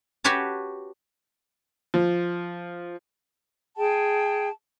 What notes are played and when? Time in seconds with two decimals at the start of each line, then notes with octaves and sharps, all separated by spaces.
0.24 F#4 G4 B4 C#5 A5
1.94 F3
3.77 G#4 G5 A5